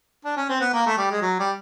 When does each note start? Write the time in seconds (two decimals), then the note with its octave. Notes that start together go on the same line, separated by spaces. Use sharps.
0.25 D4
0.37 C#4
0.50 C4
0.61 B3
0.73 A#3
0.86 A3
0.98 G3
1.11 G#3
1.22 F#3
1.39 G3